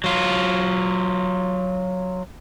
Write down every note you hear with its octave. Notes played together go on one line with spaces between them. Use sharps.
F#3 F4